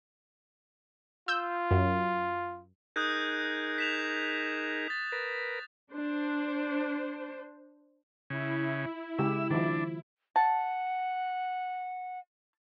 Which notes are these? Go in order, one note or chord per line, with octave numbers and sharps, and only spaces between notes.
F4 E6 G6
F#2
D#4 G#4 A#4 D#6 F#6 G6
B6 E7 F7
A6
A#4 B4
D4 C5
C#3 E4
C#3 G#3 G4 E6
D#3 F3 D4
F#5 A5